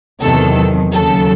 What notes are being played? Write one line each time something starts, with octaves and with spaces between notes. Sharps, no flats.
E2 C3 D#3 F#3 A4
D#2 C#3 F#3 A4